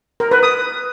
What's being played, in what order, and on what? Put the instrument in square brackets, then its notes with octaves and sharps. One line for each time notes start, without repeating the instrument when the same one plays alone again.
[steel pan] A#4
B4
D#6